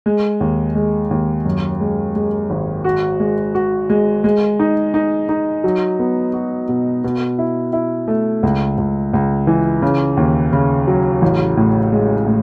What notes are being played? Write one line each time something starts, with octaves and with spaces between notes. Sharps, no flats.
G#3
D#2
G#3
D#2
F#2
G#3
G#3
G#1
F#4
G#3
F#4
G#3
G#3
D#4
D#4
D#4
F#3
B3
F#4
B2
B2
E4
E4
A3
C#2
C#2
C#2
E3
C#3
D#2
C#3
F#3
A1
A2
G#3
A2